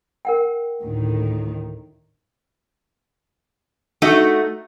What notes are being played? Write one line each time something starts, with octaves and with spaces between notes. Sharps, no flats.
A#4 F#5 G5
D2 A2 D#3
A3 D#4 F#4